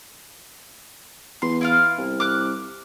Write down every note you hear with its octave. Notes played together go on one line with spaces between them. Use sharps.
E2 C6
E4 F4 F5
C2
D6 F6 F#6